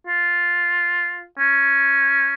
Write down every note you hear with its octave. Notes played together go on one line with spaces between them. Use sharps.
F4
C#4